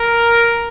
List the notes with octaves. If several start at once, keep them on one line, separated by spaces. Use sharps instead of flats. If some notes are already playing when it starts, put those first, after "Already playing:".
Already playing: A#4